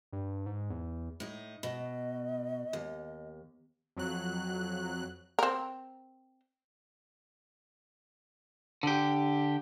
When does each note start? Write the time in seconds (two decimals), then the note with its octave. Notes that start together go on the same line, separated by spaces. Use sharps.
0.13 G2
0.46 G#2
0.70 E2
1.20 A2 D#4
1.63 B2 D#5
2.73 D#2
3.97 F2 F#3 F#6
5.39 C4 A#4
8.83 D3 G4